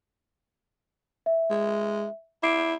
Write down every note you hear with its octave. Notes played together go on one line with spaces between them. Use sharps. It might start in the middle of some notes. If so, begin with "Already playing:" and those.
E5
G#3
E4 D6 C7 D7